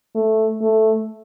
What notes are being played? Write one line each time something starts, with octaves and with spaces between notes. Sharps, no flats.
A3
A3